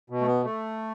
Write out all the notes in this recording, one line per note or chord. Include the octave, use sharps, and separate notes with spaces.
B2
A3
B3
A3